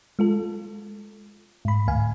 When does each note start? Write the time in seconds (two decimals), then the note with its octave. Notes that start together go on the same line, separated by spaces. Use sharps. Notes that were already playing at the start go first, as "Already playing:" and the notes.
0.19 G#3 F4 A4
1.65 G#2 B5
1.88 D2 A2 F5 G#5